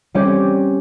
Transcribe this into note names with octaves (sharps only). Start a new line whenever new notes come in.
G3 C4 C#4 G4